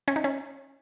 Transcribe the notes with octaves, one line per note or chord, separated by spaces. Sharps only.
C#4
D#4
C#4